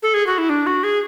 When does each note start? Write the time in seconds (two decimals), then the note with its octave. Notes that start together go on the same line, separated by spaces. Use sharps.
0.03 A4
0.14 G#4
0.27 F#4
0.38 E4
0.49 D4
0.67 F#4
0.84 G#4